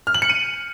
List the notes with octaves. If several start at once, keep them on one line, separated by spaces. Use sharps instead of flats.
F6
F#7
C#7
D#7